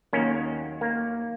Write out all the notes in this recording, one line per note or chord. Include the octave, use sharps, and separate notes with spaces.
D#2 D#3 F#3 A#3 C#4
A#3